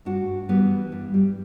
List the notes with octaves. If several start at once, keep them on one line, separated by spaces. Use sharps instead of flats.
G2 D4 F#4
E3 G3 B3
G2 G3
G3